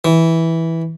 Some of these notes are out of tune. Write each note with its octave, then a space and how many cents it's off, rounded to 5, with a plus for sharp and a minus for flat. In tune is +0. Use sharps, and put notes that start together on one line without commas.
E3 -10